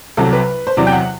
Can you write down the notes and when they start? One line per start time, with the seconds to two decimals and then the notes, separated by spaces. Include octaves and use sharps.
0.17 C2 C3 F#3 A4
0.33 B4
0.67 C5
0.77 E2 C3 F#3 D5
0.87 G5
0.92 F#5